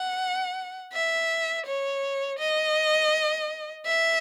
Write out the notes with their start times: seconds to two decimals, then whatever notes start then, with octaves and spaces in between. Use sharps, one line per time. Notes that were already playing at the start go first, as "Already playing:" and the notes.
Already playing: F#5
0.93 E5
1.67 C#5
2.40 D#5
3.86 E5